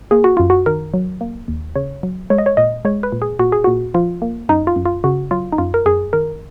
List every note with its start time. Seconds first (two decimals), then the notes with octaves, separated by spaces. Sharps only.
0.11 A#3 G#4
0.24 F#4
0.37 F#2 F4
0.50 F#4
0.66 D#3 A#4
0.94 F#3
1.21 A#3
1.48 D#2
1.76 C#3 C#5
2.03 F#3
2.30 G#3 C#5
2.38 D#5
2.46 C#5
2.57 A#2 D#5
2.85 G#3 C#5
3.03 B4
3.12 A#2
3.22 G#4
3.39 A#2 F#4
3.52 G#4
3.64 A#2 F#4
3.94 F3 F4
4.22 A#3
4.49 F#2 D#4
4.67 F4
4.76 F#2
4.86 F4
5.04 C#3 F#4
5.31 F#3 F4
5.52 D#4
5.58 F#2 F4
5.74 A#4
5.86 F#2 G#4
6.13 D#3 A#4